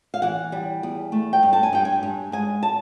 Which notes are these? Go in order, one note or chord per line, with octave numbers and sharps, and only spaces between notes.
F5
E3 F#5
G3
E2
A3
G5
G2
A5
G#5
G2 G5
G#5
G2
G#2 G#5
A5